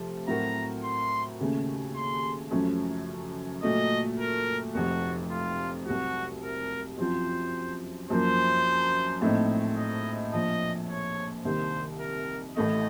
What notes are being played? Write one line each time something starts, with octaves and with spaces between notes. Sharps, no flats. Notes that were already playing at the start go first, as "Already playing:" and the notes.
Already playing: C3 F3 A3 F4
A2 F#3 C4 F#4 A#4 A#5
C6
D#2 C#3 A3 C#4
C6
F#2 F3 A3 C#4
A#2 F#3 A3 D#5
A#4
F1 F2 C3 F#4
F4
C2 C3 F#3 F#4
A#4
F#2 F3 C4 F4 C5
F#2 F3 A#3 C5
A#1 A2 A3 C4 D#4
D#5
A#1 A#2 F3 D#5
C#5
C2 C3 D#3 A#3 C5
A#4
A1 A2 A3 D#5